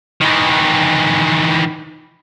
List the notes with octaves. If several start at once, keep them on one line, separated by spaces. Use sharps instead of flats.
D#3 E3